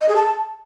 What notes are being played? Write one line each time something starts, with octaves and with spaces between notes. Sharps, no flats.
D#5
G#4
A5